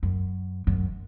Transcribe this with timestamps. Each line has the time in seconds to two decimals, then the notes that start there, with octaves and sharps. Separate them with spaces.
0.03 F#2
0.67 F#2